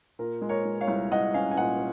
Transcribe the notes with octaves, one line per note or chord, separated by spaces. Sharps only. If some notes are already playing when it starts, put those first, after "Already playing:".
A#2 A#4
G#3
A#4 C#5
G#3
C#5 F5
C2
C2 D#5 F#5
C#4 F5 G#5
G#5
A#2 D#5 F#5